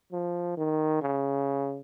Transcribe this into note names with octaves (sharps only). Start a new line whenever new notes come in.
F3
D#3
C#3